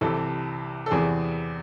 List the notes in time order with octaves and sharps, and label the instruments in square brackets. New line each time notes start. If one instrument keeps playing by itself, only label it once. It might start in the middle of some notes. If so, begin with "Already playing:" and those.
[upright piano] C2 C3 E3 A4
A4
E2 C3 E3 G#4